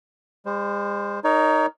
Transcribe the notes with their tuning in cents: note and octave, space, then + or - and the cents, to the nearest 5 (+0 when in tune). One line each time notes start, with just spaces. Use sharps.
G#3 -45 C5 +0
D#4 +0 A#4 +0 C#5 +30